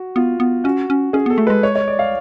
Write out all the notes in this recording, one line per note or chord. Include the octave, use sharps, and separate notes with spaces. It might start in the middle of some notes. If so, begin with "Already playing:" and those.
Already playing: F#4
B3 F4
B3
C#4 F#4
C#4
C#4 G#4
B3 A4
A3
G#3 B4
C#5
C#5
D5
F5